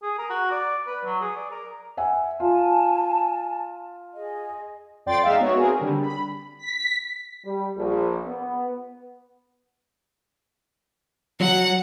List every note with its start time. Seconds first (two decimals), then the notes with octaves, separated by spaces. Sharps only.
0.02 G#4
0.18 A#4
0.30 F#4
0.51 D5
0.87 B4
1.05 F#3
1.21 G#4
1.36 D5
1.51 A#4
1.97 E5 F#5 G#5
2.40 F4 G#5 A5
4.13 G#4 D#5
5.06 F2 D5 G5 C6 A6
5.23 G#3 D#4 E5 F5
5.40 B3 F#4 C#5
5.57 C4 G#4 A#4
5.79 D3 G3
6.03 B5
6.58 B6
7.45 G3
7.77 A#1
8.27 B3
11.41 F#3 F#5